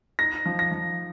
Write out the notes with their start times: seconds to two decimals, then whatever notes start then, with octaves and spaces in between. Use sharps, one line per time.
0.19 D#4 A#6
0.46 F3
0.59 A#6
0.72 F3